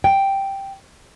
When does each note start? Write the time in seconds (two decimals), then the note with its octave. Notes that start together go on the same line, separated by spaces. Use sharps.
0.04 G5